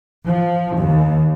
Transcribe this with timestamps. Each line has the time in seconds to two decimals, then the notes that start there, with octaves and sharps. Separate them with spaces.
0.26 F3
0.76 D#2